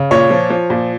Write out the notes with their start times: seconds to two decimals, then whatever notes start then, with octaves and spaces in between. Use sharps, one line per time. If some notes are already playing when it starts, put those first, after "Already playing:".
Already playing: C#3
0.11 A#2 C#5
0.31 F3
0.50 F3
0.70 A#2